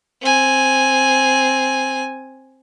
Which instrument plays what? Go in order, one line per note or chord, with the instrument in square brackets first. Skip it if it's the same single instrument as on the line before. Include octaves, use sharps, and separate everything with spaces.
[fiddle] C4 G#5